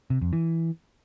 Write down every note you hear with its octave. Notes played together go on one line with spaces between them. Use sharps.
C3
F2
E3